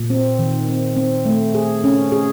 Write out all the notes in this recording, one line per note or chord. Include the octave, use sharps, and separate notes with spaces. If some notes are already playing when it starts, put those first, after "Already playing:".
Already playing: A#2
C4
D#3
C4
C4
A3
G#4
C#4
G#4